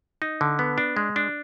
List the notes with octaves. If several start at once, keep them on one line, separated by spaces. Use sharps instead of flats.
D#4
D3
B3
D4
G#3
D4